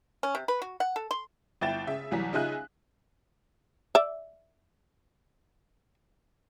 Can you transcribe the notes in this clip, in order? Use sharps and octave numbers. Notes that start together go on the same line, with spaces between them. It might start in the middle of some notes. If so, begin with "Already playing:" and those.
C#4
C3
B4
F#4
F#5
A4
C6
G1 E4 G5 A6 E7
C#3 E5
C2 E3 F#3 A#5 B6
C#3 D#4 F4 E5 G#5 F#6
D5 E5